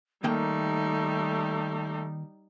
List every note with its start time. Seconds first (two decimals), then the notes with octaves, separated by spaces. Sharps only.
0.24 D#3 G3 A3 A#3 D#4 G5